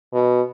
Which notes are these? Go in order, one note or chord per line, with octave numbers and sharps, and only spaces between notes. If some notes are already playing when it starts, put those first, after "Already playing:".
B2